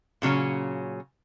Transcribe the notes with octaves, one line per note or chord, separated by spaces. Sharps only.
A#2 C#3 F#3 C#4